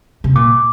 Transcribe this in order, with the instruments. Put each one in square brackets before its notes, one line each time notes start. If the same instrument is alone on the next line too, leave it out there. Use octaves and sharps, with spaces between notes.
[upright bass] C3
[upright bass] A#2 [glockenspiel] D6